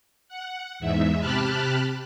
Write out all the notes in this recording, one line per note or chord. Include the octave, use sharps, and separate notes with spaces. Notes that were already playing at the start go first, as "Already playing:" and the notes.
F#5
E2 G#2 E5
C3 G4 A5 B5 F6 F#6